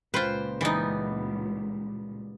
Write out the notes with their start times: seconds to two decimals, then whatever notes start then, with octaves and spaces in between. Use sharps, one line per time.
0.14 C#2 A#2 F4 B4 C5 G5
0.61 E3 G3 B3 D#4